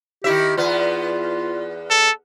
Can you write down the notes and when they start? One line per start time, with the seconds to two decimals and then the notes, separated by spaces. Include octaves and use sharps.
0.24 D#3 E4 G4 E5
0.57 E2 B3 F4
1.91 A4